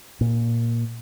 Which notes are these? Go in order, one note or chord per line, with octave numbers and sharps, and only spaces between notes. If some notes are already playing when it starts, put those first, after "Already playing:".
A#2